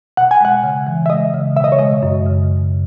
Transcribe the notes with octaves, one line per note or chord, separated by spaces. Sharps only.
B2 F#5
G#5
G#3 F#5
C#3
E3
E5
G#3 D#5
C#3
B2 E5
D#5
C#5
G#3 D#5
F#2
C#3